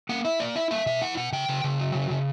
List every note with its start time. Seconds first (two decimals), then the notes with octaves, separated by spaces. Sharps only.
0.09 A#3 F#5
0.25 E4 E5
0.40 A#3 D5
0.56 E4 E5
0.71 A#3 E5
0.86 B2 E5
1.01 E4 F#5
1.17 B2 F#5
1.32 C#3 G5
1.49 C#3
1.64 C#3
1.80 F#3
1.95 C#3
2.10 C#3